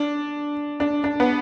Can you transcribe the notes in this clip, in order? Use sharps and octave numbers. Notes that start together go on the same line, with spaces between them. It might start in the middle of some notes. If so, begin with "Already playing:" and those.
Already playing: D4
D4
D4
B3